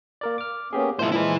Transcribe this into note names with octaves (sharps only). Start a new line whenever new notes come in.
A#3 A#4 D5
D6 F6
A#3 B3 C#4 G4 G#4
A#2 F3 G#3 E4 C5 E5
G#3 E4 F4 B4